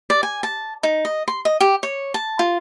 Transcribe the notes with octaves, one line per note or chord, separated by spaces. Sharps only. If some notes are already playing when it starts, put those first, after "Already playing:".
D5
G#5
A5
D#4
D#5
C6
D#5
G4
C#5
A5
F4